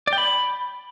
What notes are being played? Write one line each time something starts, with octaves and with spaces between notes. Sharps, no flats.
D5
G5
B5